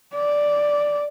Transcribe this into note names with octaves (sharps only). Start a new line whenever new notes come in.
D5